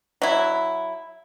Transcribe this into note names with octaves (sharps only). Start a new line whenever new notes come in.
F#3 E4